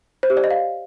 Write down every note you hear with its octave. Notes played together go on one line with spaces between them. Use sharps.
C5
G4
D5
D#5
F5